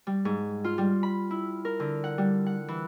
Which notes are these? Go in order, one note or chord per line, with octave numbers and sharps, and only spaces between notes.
G3
G#2
F4
G3
B5
E4
A#4
D3
F#5
G3
F#5
E3